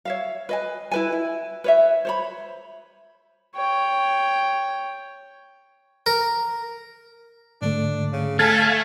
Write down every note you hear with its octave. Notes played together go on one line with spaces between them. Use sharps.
C#5 E5 F5
B4 D#5 G#5
E4 B4 G#5
E4
B4 C#5 E5
C5 C#5 B5
C#5 G5
A#4
G#2 D3 A3 D4
C#3
A3 A4 F5 G#5 A5